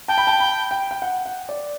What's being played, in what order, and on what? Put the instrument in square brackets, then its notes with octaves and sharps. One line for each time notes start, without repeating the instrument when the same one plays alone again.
[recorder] G5 [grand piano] A5
[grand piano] B5
A5
B5
G5
G5
F#5
F#5
D5